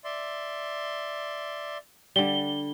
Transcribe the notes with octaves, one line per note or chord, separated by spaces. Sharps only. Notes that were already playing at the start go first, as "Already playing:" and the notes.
D5 E5 C6
D3 G3 G7